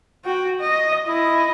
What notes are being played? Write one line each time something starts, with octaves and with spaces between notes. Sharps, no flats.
F#4 G5
D#5
E4 D#5